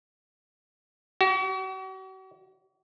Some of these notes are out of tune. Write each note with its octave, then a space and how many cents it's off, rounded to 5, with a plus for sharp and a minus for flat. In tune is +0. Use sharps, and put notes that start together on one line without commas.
F#4 +40